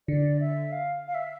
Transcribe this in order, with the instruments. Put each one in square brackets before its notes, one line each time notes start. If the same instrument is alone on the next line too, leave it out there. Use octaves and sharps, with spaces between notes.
[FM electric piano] D3 [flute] D5
[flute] E5
F5
F5
E5